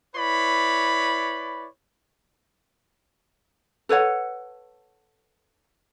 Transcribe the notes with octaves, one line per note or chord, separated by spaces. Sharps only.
E4 B4 C#5 D5 B5
A4 B4 C#5 F#5